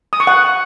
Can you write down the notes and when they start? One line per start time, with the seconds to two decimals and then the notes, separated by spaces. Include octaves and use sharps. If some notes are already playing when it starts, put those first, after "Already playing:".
0.13 D#6
0.20 C#6
0.27 F#5